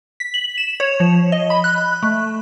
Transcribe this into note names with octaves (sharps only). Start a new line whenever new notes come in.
B6
F#7
E7
C#5
F3
D#5
B5
F#6
A3